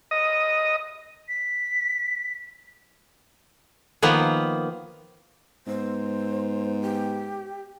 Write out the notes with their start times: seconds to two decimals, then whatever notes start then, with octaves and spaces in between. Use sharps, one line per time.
0.11 D#5
1.28 B6
4.02 D#3 F3 A#3 B3
5.67 G#2 B3 C5
6.82 G4